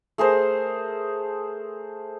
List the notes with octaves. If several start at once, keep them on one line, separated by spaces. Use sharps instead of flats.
A3 G#4 A#4 C5